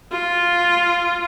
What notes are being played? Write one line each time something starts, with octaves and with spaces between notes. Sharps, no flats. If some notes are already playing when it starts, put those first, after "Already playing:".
F4